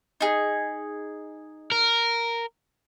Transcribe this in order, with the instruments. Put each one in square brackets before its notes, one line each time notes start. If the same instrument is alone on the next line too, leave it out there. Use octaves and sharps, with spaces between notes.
[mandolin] D#4 G#4
[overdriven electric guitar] A#4